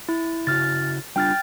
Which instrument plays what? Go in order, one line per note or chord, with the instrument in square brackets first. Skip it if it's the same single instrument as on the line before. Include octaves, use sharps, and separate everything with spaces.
[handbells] E4
[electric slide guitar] C#3 E4 F#4 [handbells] F6 A6
[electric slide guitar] G3 D4 F4 [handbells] G5 F6 A6